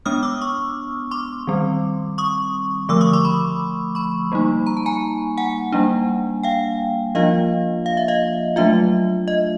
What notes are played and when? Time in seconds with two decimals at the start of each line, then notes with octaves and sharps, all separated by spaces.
0.06 G#3 B3 D4 D#6 F6
0.23 D6 E6
0.41 C#6 D#6
1.11 C6 D6
1.47 D#3 G3 C4
2.18 C#6 D#6
2.89 D3 F3 A3 D6 E6
3.01 C#6 D#6
3.13 C6 D6
3.25 B5 C#6
3.95 B5 C#6
4.32 G3 A#3 D#4
4.67 A#5
4.77 A5
4.86 G#5 A#5
5.38 F#5 G#5
5.72 G3 A#3 D4
6.43 F5 G5
7.15 F3 A#3 D4 F4 D#5 F5
7.86 F5
7.97 E5
8.08 D#5 F5
8.56 F#3 A3 D4 F4 E5
9.28 D#5